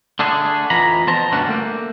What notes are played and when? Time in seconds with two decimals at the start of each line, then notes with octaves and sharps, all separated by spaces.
0.19 D3 A3 D4 G#4
0.70 F2 E3 A#5 B5
1.07 B3 C5 A5 A#5
1.32 D2 G2 C3 C#4 D4 F#5
1.48 A3 A#3